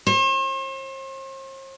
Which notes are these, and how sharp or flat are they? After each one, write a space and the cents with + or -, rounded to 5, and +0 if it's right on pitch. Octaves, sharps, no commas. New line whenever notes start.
C5 +45